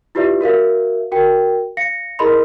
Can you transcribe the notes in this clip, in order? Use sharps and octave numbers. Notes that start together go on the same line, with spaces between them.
E4 F4 G4 B4 D5 E5
F#4 A#4 E5 F5
F#4 A#4 G5
F5 A#6 C#7
E4 G#4 A#4 D#5 B5 C6